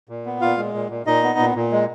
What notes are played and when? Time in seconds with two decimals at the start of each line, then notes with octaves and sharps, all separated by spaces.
0.09 A#2
0.26 B3
0.41 A#2 F4 F5
0.57 G#3
0.74 A#2
0.91 A#2
1.06 A#2 D#4 D#5
1.24 B3
1.39 A#2
1.55 A#2
1.72 G#3